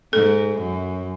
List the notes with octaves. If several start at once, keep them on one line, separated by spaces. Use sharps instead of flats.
G#2 A4
F#2